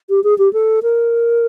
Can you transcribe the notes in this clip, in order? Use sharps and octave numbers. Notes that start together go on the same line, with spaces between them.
G4
G#4
G4
A4
A#4